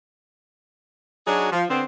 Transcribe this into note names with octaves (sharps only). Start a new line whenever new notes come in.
F#3 D4 D#4 F#4 G#4
F3
D3 B3 C4